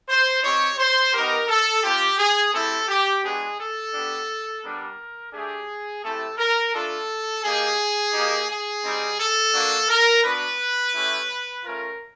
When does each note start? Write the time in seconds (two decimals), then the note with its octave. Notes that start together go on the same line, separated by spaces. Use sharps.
0.08 C5
0.43 C4 D#4 G4 C#5
0.78 C5
1.13 B3 D#4 G4 A#4
1.48 A4
1.83 C4 F4 G4
2.18 G#4
2.53 A3 C4 E4 G4 A4
2.88 G4
3.22 G#3 B3 D4 F#4 G#4
3.58 A4
3.92 B3 D4 G4
4.63 G3 B3 D4 A#4
5.33 A3 D4 G4 G#4
6.03 A3 C4 E4 G4 A4
6.38 A#4
6.73 A3 D4 F4 A4
7.43 A#3 D#4 G4 G#4
8.13 A#3 D#4 G4
8.48 G#4
8.83 G3 C4 D#4
9.18 A4
9.53 A#3 D4 F#4
9.89 A#4
10.23 B3 D4 F#4 B4
10.93 A3 C#4 E4 G4
11.64 A3 C#4 F4 A#4